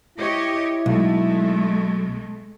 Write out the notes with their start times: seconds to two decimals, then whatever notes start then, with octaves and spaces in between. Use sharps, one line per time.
0.18 E4 G4 C#5 D#5
0.86 B1 G#3 A3